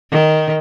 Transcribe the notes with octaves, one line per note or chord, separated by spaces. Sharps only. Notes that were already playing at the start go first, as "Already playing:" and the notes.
D#3